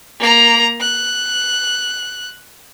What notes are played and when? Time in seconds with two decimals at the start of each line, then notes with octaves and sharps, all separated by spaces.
0.19 A#3 A#5
0.80 F#6